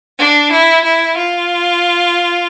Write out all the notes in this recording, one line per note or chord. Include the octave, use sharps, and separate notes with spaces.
D4
E4
E4
F4